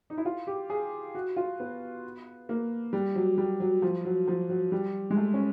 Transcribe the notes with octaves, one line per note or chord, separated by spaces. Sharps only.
D#4
E4
F4
G4
G#4
F#4
F4
B3
A#3
G3
F#3
G3
F#3
F3
F#3
F3
F#3
G3
G#3
A3
C#4